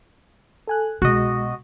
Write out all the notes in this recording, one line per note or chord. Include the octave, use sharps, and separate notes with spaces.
A4 G#5 F#6
C2 B2 G#3 F#4 D#5